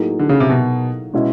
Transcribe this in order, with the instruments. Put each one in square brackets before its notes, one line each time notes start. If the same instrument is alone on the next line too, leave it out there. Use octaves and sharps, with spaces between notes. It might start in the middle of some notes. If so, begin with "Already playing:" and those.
Already playing: [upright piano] A2 F#3 A#3 D#4 G#4
[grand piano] D3
C#3
C3
B2
[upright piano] B2 G#3 C#4 E4